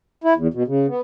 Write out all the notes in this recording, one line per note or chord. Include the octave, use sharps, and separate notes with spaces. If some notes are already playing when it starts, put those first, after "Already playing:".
E4
E2
B2
C#3
B3